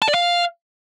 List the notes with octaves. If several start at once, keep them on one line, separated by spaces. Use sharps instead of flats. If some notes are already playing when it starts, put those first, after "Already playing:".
A5
D5
F5